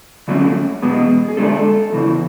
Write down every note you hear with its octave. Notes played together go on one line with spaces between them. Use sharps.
D3 F#3 A3 C#4
E2 B2 G#3 B3
G#4
D3 G#3 D4 A4
E2 C#3 E3